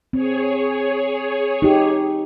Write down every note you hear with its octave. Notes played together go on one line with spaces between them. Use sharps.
C4 G#4 C#5
D#4 G4